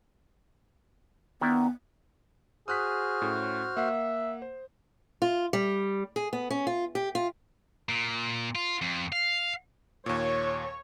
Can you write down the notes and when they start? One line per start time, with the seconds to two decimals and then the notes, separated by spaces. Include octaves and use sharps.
1.41 D#3 B3 D4 E4
2.68 F#4 G#4 C5 D#6 F6 F#6 B6
3.22 A2 C#4
3.77 A#3 E5 F#5 C7
4.42 C5
5.22 F4
5.53 G3
6.16 G#4
6.33 B3
6.51 C#4
6.67 F4
6.95 G4
7.15 F4
7.89 A#2
8.55 F4
8.82 F2
9.12 F5
10.06 D#2 A#2 C#5